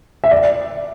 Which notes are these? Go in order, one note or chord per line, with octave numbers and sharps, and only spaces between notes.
E5
D5